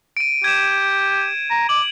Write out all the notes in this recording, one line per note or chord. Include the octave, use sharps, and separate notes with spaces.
D7 D#7
G4 G#6 E7
A#5
D6 F#7